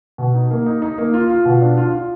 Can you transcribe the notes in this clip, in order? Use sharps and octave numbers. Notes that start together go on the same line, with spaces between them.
B2
D#4
A#3
D#4
D#4
A#3
F4
F4
B2
D4
F4
F4